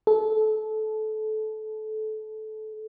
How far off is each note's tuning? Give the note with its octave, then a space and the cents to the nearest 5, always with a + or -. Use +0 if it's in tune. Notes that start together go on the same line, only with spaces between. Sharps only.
A4 -20